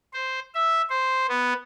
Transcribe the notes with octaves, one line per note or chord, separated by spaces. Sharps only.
C5
E5
C5
B3